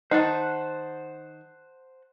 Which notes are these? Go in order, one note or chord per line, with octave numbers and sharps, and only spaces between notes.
D#3 D#4 C5 F#5 A5